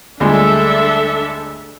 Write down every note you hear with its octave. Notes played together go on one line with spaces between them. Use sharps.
D2 G3 G#3 D4 A4 E5